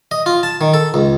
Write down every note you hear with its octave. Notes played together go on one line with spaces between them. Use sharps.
D#5
F4
A5
D#3
A4
C#2